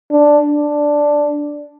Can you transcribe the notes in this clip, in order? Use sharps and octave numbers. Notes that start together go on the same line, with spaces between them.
D4
D4